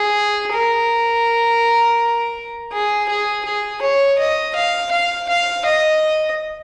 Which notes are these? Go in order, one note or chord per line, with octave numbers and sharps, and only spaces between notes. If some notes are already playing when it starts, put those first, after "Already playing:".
Already playing: G#4
A#4
G#4
G#4
G#4
C#5
D#5
F5
F5
F5
D#5